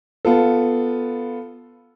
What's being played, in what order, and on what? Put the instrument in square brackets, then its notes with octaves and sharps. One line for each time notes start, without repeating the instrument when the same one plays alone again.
[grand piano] B3 F4 A4